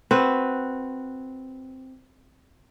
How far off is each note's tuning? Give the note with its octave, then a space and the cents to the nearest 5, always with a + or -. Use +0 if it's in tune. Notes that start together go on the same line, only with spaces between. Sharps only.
C4 +0 F#4 +0 B4 +0